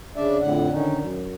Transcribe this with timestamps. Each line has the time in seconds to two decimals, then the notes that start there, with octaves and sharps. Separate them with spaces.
0.16 C#3 D4 D5 E5
0.41 F2 A2 D3 F#5
0.72 D3 D#3 C#4 D#4
0.98 F#2